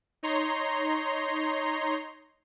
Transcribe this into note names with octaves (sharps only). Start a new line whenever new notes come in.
D#4 C#5 A#5 C6